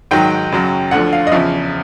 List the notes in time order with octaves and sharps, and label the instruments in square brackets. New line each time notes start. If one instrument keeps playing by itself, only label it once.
[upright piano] G#2 D#3 F#3 G5
F#2 C#3 F#3
D2 D3 F3 F#5
F5
D#5
E2 C#3 F3 E5